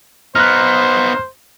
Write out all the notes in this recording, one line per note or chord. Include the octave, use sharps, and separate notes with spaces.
B3 D#4 C5 F6 F#6